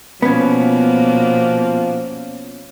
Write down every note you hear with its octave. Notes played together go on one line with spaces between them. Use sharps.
B2 F3 A#3 B3 C#4